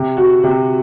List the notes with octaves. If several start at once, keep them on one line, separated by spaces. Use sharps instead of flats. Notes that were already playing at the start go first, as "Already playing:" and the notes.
Already playing: C3
F#4
C3